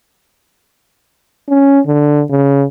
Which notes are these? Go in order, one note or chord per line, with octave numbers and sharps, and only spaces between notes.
C#4
D3
C#3